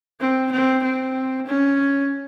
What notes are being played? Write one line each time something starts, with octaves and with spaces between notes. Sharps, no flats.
C4
C4
C4
C#4